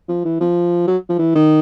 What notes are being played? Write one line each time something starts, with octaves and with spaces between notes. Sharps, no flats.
F3
E3
F3
F#3
F3
E3
D#3